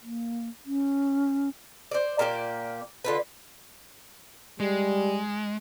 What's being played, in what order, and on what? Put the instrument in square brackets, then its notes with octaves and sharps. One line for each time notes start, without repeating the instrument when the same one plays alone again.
[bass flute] A#3
C#4
[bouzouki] C5 D5
A#2 A#3 G4 D5
D3 F4 B4
[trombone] G3 [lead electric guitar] G#3